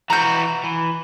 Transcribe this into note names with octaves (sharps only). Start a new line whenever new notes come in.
E3 F#4 A#5 G6
E3